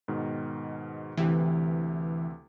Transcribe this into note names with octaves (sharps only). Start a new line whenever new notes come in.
G#2 B2 D#3
D2 C3 E3 G4